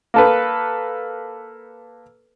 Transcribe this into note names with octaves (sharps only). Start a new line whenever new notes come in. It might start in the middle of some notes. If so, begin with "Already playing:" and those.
A#3 A4 B4